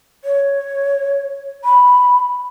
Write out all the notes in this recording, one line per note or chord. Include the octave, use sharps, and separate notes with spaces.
C#5
B5